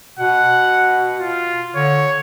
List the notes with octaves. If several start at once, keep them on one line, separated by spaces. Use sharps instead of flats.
B2 F#5
F4
D3 C#5